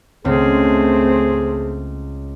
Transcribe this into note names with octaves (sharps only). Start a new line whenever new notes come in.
C#2 A3 C4 G#4